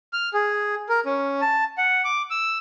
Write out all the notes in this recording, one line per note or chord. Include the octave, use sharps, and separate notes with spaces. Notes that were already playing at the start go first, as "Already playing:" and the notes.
F6
G#4
A#4
C#4
A5
F#5
D6
E6